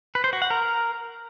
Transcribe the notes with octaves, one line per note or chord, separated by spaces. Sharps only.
B4
C5
F#4
F#5
A#4